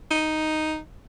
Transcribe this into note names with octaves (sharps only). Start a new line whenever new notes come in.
D#4